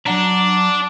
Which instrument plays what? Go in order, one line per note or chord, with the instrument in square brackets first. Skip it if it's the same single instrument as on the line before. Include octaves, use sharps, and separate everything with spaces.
[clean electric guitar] F#3 F#5 A#5 [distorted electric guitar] D4